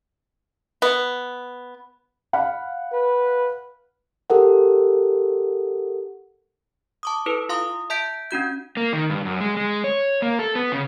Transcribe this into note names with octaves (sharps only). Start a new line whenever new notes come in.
B3
F5 F#5 B5
B4
G4 A4 A#4 F#5
A5 D6 D#6
E4 A4 B4
F4 F5 C6 D#6
E5 A5 G6 B6 D7
C#4 D4 F#4 G6
A#3
D#3
G2
F#2
G#3
G#3
C#5
A#3
A4
B3
C#3